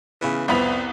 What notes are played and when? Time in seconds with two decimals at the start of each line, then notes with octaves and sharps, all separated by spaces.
0.22 C#3 E3 B3
0.48 C2 F2 B3 C4 E4 B5 F7